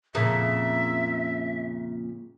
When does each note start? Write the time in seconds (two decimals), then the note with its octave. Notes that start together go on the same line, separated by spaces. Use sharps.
0.15 F2 A#2 C#3 E5